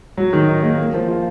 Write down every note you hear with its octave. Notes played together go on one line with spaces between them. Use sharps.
F#3
D#3
D#4
A#3
A#3
F3
F4